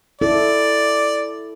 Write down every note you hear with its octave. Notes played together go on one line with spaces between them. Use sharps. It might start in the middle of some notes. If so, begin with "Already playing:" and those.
E4 A4 D5